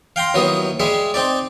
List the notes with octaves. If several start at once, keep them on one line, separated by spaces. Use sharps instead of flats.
F5 G5 A#5 C6
D#2 F#3 B3 E4 D#5 D#6
G3 G#3 G#4 E5
C4 D#4 D5